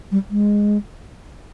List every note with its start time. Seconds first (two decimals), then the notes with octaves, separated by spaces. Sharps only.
0.12 G3
0.30 G#3